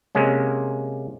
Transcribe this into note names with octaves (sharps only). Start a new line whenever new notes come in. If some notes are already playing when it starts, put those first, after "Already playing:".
C3 G#3 A#3 C#4